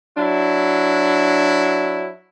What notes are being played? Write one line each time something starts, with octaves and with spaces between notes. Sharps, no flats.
F#3 D4 E4